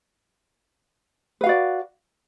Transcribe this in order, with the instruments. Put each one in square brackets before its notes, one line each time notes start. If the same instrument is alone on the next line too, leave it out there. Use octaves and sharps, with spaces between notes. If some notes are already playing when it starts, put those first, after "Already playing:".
[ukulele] B4
F5
F#4
D5